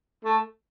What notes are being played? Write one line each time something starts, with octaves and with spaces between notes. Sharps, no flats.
A3